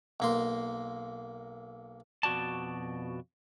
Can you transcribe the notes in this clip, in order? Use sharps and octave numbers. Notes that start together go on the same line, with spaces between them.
B1 A#3 C6
F2 B2 F#4 D5 A5